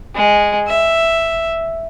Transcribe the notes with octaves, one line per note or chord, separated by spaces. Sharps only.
G#3
E5